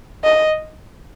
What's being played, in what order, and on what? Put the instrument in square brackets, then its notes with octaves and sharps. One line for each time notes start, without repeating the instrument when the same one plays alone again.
[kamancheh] D#5